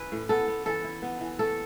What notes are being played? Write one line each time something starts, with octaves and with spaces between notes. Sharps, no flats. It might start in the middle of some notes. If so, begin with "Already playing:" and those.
Already playing: C#4 E4 B4
A2
B3 A4
B3
E3 A4
E4
B3
E3
A3 A4